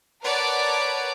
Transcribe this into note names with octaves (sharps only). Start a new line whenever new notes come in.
A#4 B4 C#5 D5 F#5 A5